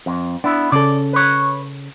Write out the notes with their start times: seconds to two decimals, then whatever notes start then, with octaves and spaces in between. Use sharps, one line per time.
0.06 F2
0.44 B3 D4 E4
0.72 C#3 A4 D5
1.13 B4 C#5